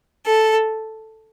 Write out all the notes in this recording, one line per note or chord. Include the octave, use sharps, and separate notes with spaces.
A4